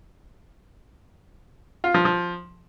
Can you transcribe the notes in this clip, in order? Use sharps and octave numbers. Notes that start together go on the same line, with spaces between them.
F4
F3
F3